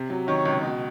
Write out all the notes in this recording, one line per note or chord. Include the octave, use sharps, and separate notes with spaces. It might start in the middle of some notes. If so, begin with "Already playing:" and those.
Already playing: C3
F#3
D#3 C#5
C#2
B2